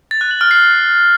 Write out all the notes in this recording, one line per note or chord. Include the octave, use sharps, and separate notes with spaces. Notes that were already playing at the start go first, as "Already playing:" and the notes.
A6
F#6
F#7
F6
C7